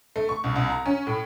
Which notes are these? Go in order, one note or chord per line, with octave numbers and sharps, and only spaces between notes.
A3
C#6
C2
C2
A#5
C#4
A2